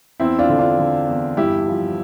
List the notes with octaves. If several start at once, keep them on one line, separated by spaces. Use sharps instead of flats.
E2 C4 E4
D4 F4
D3
D4 F4
D3
E2
G2 E4 G4
F3